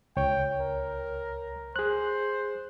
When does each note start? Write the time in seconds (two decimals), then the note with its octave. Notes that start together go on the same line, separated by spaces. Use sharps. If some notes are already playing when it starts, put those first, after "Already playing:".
0.17 C#2 C#5 G5
0.61 A#4
1.76 G#4 C5 F#6